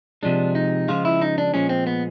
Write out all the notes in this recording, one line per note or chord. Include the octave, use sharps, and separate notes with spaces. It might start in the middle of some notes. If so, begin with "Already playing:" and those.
C3 F3 G#3 D4
D#4
C#3 F3 G#3 F4
E4
D#4
D4
A#2 F3 G#3 C#4
C4
B3